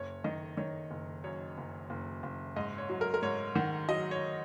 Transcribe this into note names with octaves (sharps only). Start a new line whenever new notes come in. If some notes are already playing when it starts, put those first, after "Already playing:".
Already playing: F#1 C#5
D#3 D#5
D#3 C#5
F#1
F#2 C#5
F#1
F#1
F#1
G#2 D#5
C#5
F#3
A#4
A#4
G#2 C#5
D#3 F#5
F#3 D#5
C#5